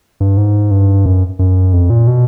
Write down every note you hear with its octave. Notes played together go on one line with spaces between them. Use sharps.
G2
G#2
G2
F#2
F#2
F2
A#2
B2